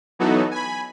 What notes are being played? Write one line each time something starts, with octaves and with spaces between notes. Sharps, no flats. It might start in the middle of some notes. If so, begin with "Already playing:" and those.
E3 F#3 B3 D#4 F#4 A4
G#5 B5